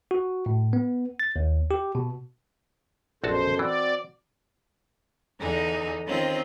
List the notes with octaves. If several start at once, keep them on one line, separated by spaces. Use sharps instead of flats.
F#4
A2
B3
A6
D#2
G4
B2
A#1 F#2 B2 F#4 A4 C5 A5
E3 C4 F#4 D5
E2 D3 D#4 G#4
D#3 C4 C#4 F4